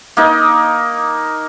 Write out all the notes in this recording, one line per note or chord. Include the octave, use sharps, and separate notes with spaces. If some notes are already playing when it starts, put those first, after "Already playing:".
A#3 D#4 D#5